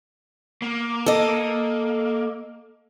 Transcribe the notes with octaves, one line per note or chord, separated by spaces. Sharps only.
A#3
A4 D#5